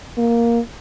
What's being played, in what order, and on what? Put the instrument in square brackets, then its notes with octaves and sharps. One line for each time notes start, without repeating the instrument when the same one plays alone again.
[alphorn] A#3